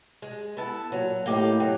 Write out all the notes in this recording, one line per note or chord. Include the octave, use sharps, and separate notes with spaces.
G#3
B3 E4 A4
A#2 F#3
A2 A#3 D#4 G4
F#3